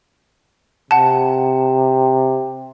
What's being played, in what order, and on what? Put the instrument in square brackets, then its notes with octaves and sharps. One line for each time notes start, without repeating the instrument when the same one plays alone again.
[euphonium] C3 [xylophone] F#5 A5